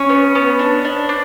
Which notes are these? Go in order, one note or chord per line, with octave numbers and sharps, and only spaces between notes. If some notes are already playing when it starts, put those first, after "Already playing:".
Already playing: C#4
B3
B3
D4
D4
D4